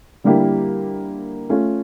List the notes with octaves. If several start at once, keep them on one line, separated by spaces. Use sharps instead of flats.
D3 G3 A#3 E4 G4
A3 C#4 F4